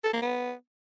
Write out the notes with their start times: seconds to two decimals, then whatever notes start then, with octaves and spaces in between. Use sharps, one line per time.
0.04 A4
0.13 A#3
0.22 B3